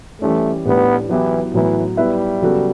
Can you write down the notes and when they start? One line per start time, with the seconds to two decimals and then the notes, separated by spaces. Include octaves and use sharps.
0.21 E3 G3 A3 C#4
0.65 A2 G3 B3 D4 G4 B4
1.09 E3 F#3 B3 E4 G4
1.53 A2 E3 F#3 B3
1.97 G3 B3 E4 B4 E5
2.42 C#3 F#3 B3 F#4 A4